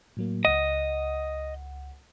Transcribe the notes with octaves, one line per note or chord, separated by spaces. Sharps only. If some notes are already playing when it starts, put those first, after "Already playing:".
A2 F#3 A#3
C#2 D#5 F#5